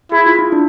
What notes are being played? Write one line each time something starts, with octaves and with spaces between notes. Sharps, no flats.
E4 G#4
F4
E4
D4